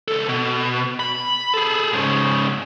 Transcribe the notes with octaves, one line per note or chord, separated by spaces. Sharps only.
C#2 A4
B2
B5
G#4 A4
G#2 C#3